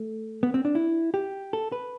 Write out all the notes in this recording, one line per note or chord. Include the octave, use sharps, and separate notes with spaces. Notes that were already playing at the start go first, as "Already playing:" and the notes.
Already playing: A3
B3
C4
D4
E4
G4
A4
B4